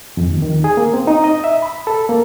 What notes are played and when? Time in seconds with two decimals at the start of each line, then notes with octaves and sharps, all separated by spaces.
0.17 F2
0.30 D#2
0.42 D#3
0.64 G#4
0.77 A#3
0.94 C4
1.07 D#4
1.24 D#5
1.44 E5
1.62 B5
1.87 A4
2.09 A#3